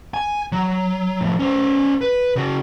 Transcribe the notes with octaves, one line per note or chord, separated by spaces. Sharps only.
G#5
F#3
A2 F3
C#4 C5
B4
C#3 F#4